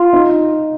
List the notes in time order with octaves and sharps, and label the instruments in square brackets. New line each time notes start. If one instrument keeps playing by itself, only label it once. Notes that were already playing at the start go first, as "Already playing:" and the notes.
Already playing: [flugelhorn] F4
[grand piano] D#4